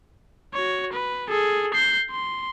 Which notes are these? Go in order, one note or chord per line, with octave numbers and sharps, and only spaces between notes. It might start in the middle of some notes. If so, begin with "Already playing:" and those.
F#4 C#5
B4
G#4 A4
G6 C7
C6